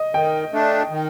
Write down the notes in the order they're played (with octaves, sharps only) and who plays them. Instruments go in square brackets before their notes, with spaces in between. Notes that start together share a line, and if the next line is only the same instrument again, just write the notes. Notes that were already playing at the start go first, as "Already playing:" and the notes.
Already playing: [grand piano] D#5
[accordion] D#3 [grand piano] G5
[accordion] A3 D4
D#3